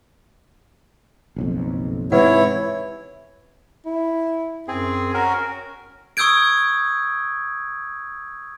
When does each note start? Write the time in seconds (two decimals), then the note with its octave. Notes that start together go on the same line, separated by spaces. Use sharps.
1.36 F#1 B1 F2
2.12 G#2 C3 E3 E4 B4 C#5 F#5
3.86 E4
4.68 F#2 C4 G#4
5.14 C#4 F#4 A#4
6.17 C#6 D#6 E6 G6 G#6 D7